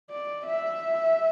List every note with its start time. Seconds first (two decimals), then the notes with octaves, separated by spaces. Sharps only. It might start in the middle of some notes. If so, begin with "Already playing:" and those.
0.10 D5
0.45 E5